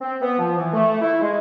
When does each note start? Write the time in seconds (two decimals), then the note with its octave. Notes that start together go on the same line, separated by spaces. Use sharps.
0.01 C4
0.22 B3
0.39 F3
0.57 E3
0.73 A3
1.02 E4
1.21 G#3